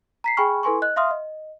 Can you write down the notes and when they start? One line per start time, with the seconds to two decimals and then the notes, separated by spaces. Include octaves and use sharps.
0.24 A#5 B6 C7
0.37 G#4 G5 G#5 B5 C#6 F6
0.63 E4 A4 B4 G#5 C6 C#6
0.82 D#5 F#6
0.96 E5 F5 C6 D#6 F6
1.11 D#5